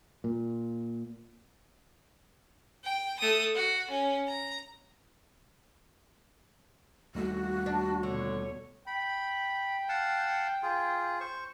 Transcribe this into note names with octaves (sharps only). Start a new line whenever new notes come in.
A#2
G5
A3 D#6
F#4
C#4
A#5
D#2 G3 A3 F#4
D4
B2 D3 C#5
G5 B5
F5 F#5 A5
F4 G#4
C5 C#6